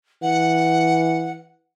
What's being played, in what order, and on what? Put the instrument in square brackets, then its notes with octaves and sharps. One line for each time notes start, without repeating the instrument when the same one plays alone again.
[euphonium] E3 [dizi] F#5